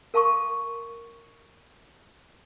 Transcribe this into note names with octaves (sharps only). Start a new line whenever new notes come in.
A#4 F5 A5 C6 C#6 D#6